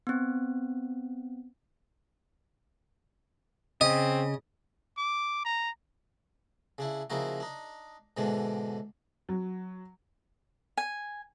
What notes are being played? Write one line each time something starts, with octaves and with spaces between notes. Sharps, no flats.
B3 C4
C#3 C4 D#5
D6
A#5
C#3 D4 E4
C#3 F3 A#3 D#4 E4 F#4
D4 D#4
G#2 B2 D3 E3 D4
F#3
G#5